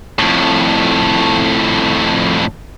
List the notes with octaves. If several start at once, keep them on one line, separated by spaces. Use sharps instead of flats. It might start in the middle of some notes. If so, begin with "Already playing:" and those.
F2 A2